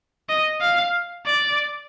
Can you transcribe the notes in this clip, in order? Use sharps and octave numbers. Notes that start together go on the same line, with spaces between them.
D#5
F5
D5